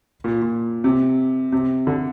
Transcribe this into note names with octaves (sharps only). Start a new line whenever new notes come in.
A#2
A#2
C3
C3
D3